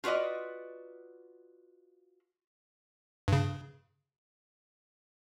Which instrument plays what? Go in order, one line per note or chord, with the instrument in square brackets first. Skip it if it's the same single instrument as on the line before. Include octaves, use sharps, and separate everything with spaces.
[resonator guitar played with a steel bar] F4 F#4 B4 D5 D#5
[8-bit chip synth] G2 C#3